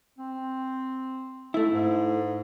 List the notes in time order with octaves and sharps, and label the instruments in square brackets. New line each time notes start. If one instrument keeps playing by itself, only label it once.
[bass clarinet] C4
[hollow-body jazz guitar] A3 E4
[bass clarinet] G#2